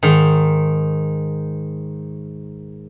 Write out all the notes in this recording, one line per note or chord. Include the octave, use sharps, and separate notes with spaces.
G#2 D#3